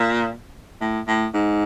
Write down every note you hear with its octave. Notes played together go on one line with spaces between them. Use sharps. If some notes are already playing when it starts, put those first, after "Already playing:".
Already playing: A#2
A2
A2
G#2